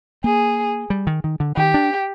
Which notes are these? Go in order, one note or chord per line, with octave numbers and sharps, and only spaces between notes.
A#3 G#4
G3
D#3
D#3
D3
D#3 G4
D4